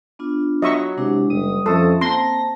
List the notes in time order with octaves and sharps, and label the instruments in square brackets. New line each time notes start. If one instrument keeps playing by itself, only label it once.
[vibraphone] B3 D4 F4
[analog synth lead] F#3 [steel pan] D#5 E5 C#6
[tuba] C3 [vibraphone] G#3 D4 E4
[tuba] F#1 [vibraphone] G3 [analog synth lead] D#6
[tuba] F2 [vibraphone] C4 C#4 E5 [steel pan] A4
[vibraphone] A#3 C5 A5 [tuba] C4 [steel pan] C6 [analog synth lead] A#6